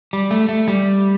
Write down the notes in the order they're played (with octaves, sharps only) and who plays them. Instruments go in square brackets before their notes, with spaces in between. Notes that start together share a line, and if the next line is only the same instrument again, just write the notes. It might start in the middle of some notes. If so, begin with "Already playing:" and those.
[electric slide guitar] G3
A3
A3
G3